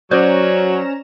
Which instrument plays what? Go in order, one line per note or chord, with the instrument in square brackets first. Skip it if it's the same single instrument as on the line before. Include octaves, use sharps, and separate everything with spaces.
[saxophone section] F#3 [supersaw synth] C#4 A#5 E7 [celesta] C5 G6 [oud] D5